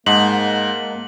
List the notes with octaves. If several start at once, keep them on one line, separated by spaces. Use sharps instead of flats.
G#2 A#3 D#5 F#5 A5 F#7